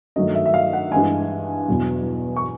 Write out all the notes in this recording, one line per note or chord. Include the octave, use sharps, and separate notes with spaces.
G2 D#3 F#3 A3 D#5
E5
E5
F5
F#5
G2 E3 G#3 G#5
E2 B2 F#3
C#6